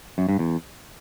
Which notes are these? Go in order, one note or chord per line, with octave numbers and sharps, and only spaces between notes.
F#2
G2
E2